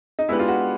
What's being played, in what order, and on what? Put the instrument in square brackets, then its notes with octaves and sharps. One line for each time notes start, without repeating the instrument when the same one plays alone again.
[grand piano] D#4
[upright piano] G#3 B3 D4 G4 B4 [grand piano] E4
[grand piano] F4
F#4